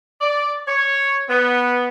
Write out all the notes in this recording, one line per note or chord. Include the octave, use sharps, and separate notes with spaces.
D5
C#5
B3